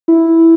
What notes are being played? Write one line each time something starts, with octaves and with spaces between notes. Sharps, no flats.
E4